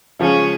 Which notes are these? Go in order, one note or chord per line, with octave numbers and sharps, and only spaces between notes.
C#3 F3 G#3 C#4